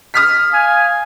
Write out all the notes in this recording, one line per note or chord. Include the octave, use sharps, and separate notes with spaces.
D#6 F6 B6
F5 G#5